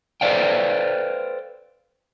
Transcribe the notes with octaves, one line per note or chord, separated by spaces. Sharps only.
A4 B4 C5 D5 F5 G5